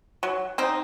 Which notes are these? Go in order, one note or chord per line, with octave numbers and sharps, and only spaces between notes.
F#3
C4 D#4